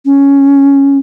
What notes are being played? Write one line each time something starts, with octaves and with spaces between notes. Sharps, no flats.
C#4